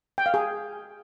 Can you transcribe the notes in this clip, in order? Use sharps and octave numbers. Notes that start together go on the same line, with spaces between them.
G5
F5
G#4